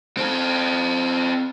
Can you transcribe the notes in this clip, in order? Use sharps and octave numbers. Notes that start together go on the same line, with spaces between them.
C4 A4